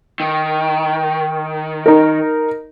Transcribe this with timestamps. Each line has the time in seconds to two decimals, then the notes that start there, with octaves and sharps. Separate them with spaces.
0.20 D#3
1.86 D#4 A#4